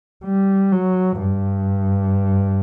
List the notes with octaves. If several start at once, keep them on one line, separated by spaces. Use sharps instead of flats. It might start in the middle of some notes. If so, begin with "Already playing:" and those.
G3
F#3
G2